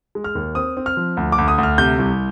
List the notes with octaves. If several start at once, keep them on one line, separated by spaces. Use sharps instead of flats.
G#3
F6
D#2
C4 D#6
C4
F6
F3
D2
D6
D2
D#6
D2
F6
C3 G6
C2